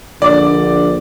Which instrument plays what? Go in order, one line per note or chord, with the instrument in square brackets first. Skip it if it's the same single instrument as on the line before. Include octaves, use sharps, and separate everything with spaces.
[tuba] A#1 [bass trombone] D3 [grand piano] D5 D6